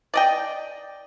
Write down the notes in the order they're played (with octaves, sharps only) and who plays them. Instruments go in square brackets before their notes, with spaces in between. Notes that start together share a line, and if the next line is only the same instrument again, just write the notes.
[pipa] D5 D#5 G5